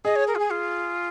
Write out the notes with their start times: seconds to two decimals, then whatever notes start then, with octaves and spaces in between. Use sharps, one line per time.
0.05 G#4 D#5
0.16 C#5
0.28 A#4
0.35 F4
0.39 G#4
0.50 F4